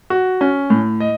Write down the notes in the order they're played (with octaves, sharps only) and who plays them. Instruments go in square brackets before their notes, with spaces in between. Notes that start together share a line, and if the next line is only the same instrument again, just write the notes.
[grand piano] F#4
C#4
A2
D#5